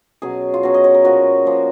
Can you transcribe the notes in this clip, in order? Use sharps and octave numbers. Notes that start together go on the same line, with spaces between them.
B2 F#3 C#4 G#4
F4
B2 F#3 C#4 F#4
D#5
C#5
A#4
A#2 F3 A#3 F#4
A#2 F3 A#3